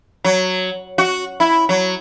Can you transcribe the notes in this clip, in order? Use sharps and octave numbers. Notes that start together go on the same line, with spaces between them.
F#3
F#4
E4
F#3